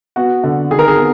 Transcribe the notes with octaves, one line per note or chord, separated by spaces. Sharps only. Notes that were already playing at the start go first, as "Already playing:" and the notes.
B3 F#4
D3
D#3 G#4
A#4
G#4
B3